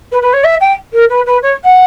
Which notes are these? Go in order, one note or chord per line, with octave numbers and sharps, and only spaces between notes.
B4
B4
C#5
E5
G5
A#4
B4
B4
C#5
F#5